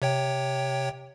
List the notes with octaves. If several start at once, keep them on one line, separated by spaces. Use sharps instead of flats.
C3 C#5 G5